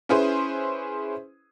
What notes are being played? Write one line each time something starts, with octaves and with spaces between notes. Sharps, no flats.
C#4 E4 G#4 B4 C5